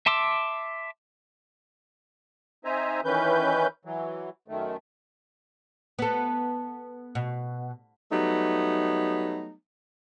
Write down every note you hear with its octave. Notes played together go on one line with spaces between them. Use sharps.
E5 A5 C6 D6 E6
C4 D#4 C5 E5 G#5 A#5
D#3 E3 C#4 B4 G6
E3 F#3
F#2 D#3 A3
B3 A4
B2
F#3 G3 A3 B3 D#4